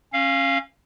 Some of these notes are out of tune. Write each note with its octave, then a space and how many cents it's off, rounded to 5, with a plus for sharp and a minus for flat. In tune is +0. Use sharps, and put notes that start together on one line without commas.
C#4 -25 F5 -5